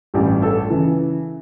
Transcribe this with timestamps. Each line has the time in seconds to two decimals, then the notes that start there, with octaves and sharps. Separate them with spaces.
0.14 A1 G2 E3 G4
0.42 A4
0.70 C#3 E3